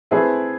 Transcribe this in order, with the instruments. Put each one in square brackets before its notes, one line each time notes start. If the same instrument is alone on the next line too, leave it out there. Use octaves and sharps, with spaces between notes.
[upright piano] A3 C4 E4 G#4 B4